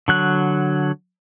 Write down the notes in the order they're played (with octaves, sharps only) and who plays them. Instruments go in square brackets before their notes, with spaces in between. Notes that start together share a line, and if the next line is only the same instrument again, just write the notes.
[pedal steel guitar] D3 F#3 F#6